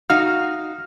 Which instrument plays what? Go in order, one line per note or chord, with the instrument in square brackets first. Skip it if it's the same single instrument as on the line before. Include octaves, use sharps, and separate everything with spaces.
[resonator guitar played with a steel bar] D#4 F#4 F5 [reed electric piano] F6